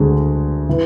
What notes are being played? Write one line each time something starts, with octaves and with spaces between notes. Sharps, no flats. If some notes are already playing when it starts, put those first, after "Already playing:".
Already playing: D2 D3 G#3
E3